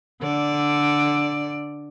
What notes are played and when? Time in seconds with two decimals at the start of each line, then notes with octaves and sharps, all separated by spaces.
0.21 D3 D5